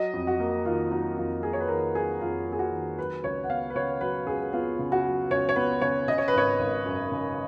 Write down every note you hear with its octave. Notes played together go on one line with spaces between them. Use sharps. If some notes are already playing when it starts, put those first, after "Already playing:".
Already playing: F#3 D#5
F2
F#4
A#3
D#3 F4
F#3 D#4
F2 F4
A#3 G#4
C#5
B4
D#3 A#4
F#3 G#4
F2 F4
A#3
G#4
F#4
D#3
F#3 B4
C#2 C#5
F#5
B3 F5
B4
C#3 C#5
F#3 B4
C#2 G#4
B3 F4
C#3
F#4
F#3
C#2 C#5
C#5
B3 B4
C#3 C#5
C#3 D#5
C#5
B4
G#1 C#5
G#1
F#2
C#3